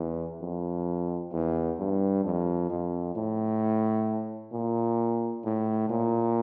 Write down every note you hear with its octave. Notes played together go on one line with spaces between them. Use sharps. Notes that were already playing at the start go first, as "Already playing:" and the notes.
Already playing: E2
F2
E2
G2
F2
F2
A2
A#2
A2
A#2